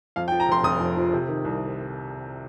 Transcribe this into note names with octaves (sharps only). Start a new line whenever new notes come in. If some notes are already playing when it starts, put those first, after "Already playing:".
F2 F5
G5
F3
A#5
F1 C6
F1 D#6
F2
F3
C3
D#3
C2